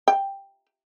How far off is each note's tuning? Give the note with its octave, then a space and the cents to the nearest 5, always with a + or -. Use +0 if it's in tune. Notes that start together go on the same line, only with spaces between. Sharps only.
G5 +5